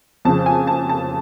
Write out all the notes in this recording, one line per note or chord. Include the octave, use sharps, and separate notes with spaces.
F2 C#3 F3 A5
G#5
A5
A5